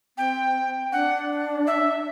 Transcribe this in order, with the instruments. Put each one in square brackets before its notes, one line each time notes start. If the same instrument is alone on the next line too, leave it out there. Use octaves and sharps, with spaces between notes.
[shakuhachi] C4 [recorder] G5
[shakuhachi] D4 [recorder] F#5
[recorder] E5